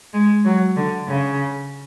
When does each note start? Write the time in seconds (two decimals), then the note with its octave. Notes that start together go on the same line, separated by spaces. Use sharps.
0.14 G#3
0.45 F#3
0.77 D3
1.08 C#3